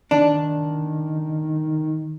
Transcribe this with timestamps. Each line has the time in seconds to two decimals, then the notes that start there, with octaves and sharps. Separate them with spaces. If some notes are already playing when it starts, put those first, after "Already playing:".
0.11 D#3 D4